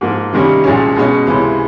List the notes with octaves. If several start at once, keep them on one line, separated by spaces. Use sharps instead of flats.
G#2 F3 A#3
C3 D#3 G3 A#3 C#4
C2 A#2 F3 G#3 C#4
B2 G#3 C#4
C#2 C3 E3 G#3